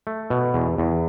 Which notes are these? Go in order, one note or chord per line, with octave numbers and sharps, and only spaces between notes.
A3
B2
E2
E2